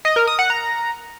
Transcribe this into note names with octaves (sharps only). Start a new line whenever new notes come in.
D#5
A#4
D#6
F#5
A#5